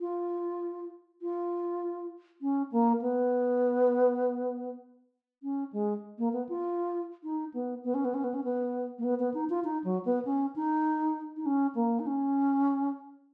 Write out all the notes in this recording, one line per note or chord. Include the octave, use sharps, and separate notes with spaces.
F4
F4
C#4
A#3
B3
C#4
G#3
A#3
B3
F4
D#4
B3
B3
C#4
B3
C#4
B3
C#4
B3
A#3
B3
B3
D#4
F4
D#4
F#3
B3
C#4
D#4
D#4
C#4
A#3
D#4
C#4